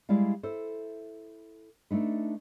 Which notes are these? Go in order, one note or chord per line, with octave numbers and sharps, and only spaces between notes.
G3 G#3 E4 D5 F5
E4 A4 C5
A3 D4 D#4 B4